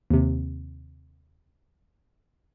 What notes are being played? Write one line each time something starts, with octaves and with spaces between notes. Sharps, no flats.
D#2 C3